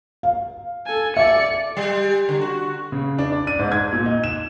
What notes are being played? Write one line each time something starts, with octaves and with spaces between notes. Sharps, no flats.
F5
A4 G#5
D5 E5 C#7
G3
D3
F#4
C#3
D4
D5
D#7
G#2
G#6
A#2
D#4
E7